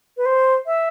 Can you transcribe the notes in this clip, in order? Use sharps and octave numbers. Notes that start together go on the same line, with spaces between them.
B4
C5
E5